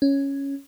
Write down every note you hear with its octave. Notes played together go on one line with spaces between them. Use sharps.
C#4